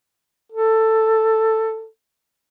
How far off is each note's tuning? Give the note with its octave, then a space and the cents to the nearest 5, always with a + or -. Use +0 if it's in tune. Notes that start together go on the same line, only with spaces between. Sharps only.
A4 +10